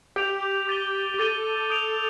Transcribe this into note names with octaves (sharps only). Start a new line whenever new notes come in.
G4 D6 G6 D7 F7
D6 A6 D#7 G7
G4
A4 D6 A6 D#7 G7
D#6 G6 D7 F7